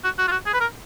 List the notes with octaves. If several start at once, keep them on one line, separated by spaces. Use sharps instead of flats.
F#4
F#4
F4
F#4
G#4
B4
A#4